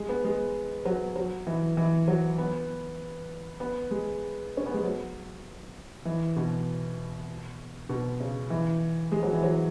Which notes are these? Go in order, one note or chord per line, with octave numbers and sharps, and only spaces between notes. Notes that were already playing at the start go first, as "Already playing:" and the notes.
Already playing: G#3
B3
G#3
F#3
F#3
E3
E3
F#3
B3
B3
G#3
C#4
B3
G#3
F#3
E3
B2
B2
C#3
E3
G#3
F#3
E3
F#3